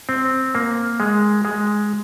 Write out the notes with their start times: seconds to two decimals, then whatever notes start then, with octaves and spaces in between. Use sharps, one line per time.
0.09 C4
0.55 A#3
1.00 G#3
1.45 G#3